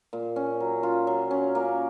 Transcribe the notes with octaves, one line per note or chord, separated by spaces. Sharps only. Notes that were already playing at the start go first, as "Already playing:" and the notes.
A#2
C#4
F#3
F4
F#3
C#4
A#3